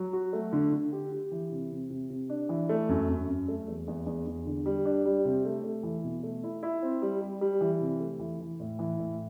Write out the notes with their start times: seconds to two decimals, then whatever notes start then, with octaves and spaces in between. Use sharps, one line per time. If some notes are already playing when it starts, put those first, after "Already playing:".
Already playing: F#3
0.13 F#4
0.33 A3
0.52 D3
0.72 D3
0.92 G4
1.12 G4
1.31 E3
1.51 C3
1.71 C3
1.90 C3
2.10 C3
2.29 D4
2.49 E3
2.69 A3
2.89 F#2
3.08 F#2
3.28 F#2
3.48 A3
3.68 E2
3.88 E2
4.06 E2
4.27 E2
4.46 D3
4.66 G3
4.85 D4
5.06 G3
5.25 C3
5.45 A3
5.64 A3
5.83 E3
6.04 B2
6.23 A3
6.43 E4
6.63 E4
6.83 C4
7.02 G3
7.21 G3
7.41 G3
7.61 E3
7.81 C3
8.00 A3
8.19 E3
8.40 E3
8.60 A2
8.79 E3
8.99 A2